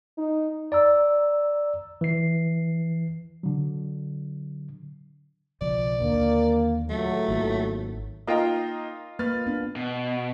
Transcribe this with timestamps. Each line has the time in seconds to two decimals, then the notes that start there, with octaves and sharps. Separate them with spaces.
0.18 D#4
0.72 D5 A#5 E6
2.01 E3 C7
3.43 D3 F#3
5.61 B1 C#3 F3 D5
6.00 D#2 D3 A#3
6.89 C#2 A2 F#3 A3
7.28 G#1 D#3 A#3
8.27 A#3 D#4 F4 A#4 D#5 G5 A#5
9.19 A#3 B4 F6 A6
9.46 B3 D4
9.76 B2